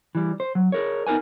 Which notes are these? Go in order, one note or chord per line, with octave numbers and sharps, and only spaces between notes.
E3 G3
C5
F#3
G#4 A#4 C#5
B3 D#4 A#4 B4 G#5